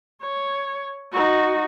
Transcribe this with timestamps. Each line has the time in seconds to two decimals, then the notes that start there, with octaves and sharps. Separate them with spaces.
0.21 C#5
1.12 D#4 F#4